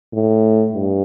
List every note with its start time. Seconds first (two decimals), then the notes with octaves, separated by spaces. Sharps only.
0.13 A2
0.73 G2